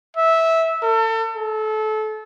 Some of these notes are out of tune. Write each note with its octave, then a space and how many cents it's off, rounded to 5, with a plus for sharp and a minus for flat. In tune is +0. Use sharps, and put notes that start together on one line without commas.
E5 -10
A4 +35
A4 -25